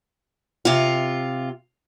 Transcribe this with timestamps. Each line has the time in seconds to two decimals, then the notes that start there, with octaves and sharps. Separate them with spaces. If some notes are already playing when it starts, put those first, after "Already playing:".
0.65 C3 F4